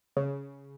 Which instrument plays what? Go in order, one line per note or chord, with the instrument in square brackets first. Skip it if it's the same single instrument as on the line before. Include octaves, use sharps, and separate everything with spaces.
[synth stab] C#3